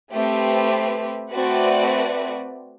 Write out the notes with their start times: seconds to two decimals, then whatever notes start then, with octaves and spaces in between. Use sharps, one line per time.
0.13 A3 C4 G4 B4
1.32 A3 C4 F#4 B4 D5